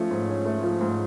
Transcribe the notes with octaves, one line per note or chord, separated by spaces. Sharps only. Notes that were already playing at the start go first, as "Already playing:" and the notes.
Already playing: F3 A3 C#4
G#2
C#4
A3
F3
G#2